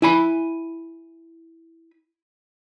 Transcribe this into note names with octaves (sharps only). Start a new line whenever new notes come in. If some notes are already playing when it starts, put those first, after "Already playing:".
E4 G#5 B5